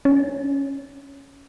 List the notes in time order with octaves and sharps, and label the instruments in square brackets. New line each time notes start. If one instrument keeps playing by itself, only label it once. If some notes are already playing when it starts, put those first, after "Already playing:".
[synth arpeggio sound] C#4